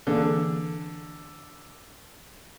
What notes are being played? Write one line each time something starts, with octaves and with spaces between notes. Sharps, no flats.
D3 E3 A#3 G#4